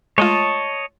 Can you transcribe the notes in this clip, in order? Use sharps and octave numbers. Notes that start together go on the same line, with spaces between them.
G#3 A3 F4 C#5 D#5 A5